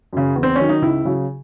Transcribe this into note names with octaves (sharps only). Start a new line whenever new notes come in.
F#2 C#3
E2
C4
D#3 F#3 C#4
D#4
C#2 E4
C#3 F#3